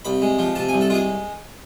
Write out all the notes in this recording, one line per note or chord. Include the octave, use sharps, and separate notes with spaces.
C2 B5
G#3
F3
C3 A5
G#5
C2
A4
G#3 F4 G#4